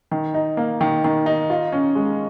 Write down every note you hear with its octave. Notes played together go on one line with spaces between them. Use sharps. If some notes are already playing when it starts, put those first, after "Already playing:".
D#3
D#4
A#3
D#3
D#3
D#4
F4
C#4
G#3